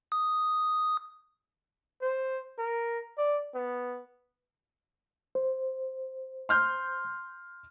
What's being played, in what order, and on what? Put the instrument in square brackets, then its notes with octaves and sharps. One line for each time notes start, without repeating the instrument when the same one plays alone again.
[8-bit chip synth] D#6
[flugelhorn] C5
A#4
D5
B3
[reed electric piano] C5
[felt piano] C6 F6 G6